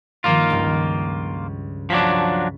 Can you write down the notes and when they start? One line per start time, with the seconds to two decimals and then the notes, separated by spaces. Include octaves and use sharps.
0.24 G2 D#3 F3 A#3 F4
0.50 C#2 G2
1.90 F3 F#3 D4 B6